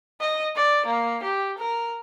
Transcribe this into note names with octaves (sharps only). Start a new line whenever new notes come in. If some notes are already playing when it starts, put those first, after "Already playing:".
D#5
D5
A#3
G4
A#4